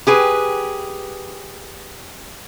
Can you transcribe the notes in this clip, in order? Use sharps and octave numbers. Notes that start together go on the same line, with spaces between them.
G4 G#4 B4